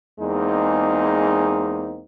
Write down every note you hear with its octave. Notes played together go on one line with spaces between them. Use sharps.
E2 G#3 A#3 C4 D#4